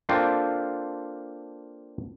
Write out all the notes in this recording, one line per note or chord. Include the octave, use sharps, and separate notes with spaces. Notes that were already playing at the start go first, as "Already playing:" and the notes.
A#3 C4 D4 F4 A4 G5